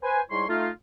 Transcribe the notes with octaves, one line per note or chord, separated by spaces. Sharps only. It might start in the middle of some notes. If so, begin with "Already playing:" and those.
B4 C5 G#5
G#2 G3 E4 C#5 C6
A3 D#4 F4